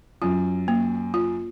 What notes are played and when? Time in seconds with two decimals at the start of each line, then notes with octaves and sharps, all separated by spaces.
0.22 F#2 F4
0.68 A#3
1.14 F4